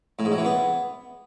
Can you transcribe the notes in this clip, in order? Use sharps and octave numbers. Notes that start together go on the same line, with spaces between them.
A2
G#2
F#3
E3
B3